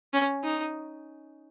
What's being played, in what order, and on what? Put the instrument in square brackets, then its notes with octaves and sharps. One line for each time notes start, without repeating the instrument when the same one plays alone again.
[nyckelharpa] C#4
D#4